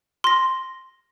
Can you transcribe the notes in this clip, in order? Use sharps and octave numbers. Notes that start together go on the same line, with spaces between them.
C6 A#6